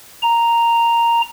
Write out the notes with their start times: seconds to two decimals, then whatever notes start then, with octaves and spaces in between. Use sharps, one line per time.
0.22 A#5